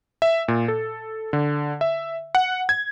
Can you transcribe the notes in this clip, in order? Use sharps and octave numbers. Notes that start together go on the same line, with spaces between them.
E5
A#2
A4
D3
E5
F#5
G#6